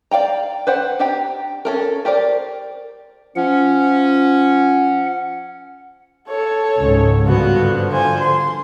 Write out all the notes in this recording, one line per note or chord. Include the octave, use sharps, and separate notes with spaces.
D5 F5 G5 A#5
B4 C5 F#5 G5
D4 G4 G5 A#5
C#4 A4 A#4
G4 A#4 C5 D5
F3 C#4 F#5
A4 C#5
C#2 G#2
G2 D3 F3 B3 F#4
C5 G#5
C6